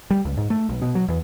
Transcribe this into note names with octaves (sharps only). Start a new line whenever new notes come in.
G3
C#2
G#2
A3
B1
B2
F#3
E2